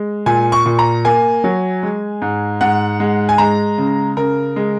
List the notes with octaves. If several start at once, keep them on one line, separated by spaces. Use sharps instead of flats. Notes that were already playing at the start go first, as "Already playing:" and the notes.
Already playing: G#3
A#2 G#5
C#6
A#2
A#5
A#3 G#5
F#3
G#3
G#2
G#2 F#5
G#3
G#5
G#3 A#5
C#3
C#3 A#4
G#3